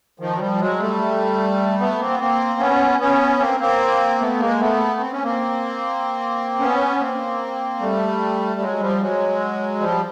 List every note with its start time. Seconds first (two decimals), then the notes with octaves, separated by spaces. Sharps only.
0.20 D#3 F3
0.35 F#3
0.39 F3 G3
0.60 F#3 G#3
0.79 G3 A3
1.80 A3 B3
2.00 A#3 C4
2.10 B3
2.20 A#3 C4
2.59 B3 C#4
3.00 B3 C#4
3.40 A#3 C4
3.60 A#3 C4
4.20 A3 B3
4.40 G#3 A#3
4.60 A3 B3
5.00 C4
5.12 C#4
5.23 A#3 C4
6.60 B3 C#4
7.00 A#3 C4
7.80 G3 A3
8.60 F#3 G#3
8.80 F3 G3
9.00 F#3 G#3
9.80 F3 G3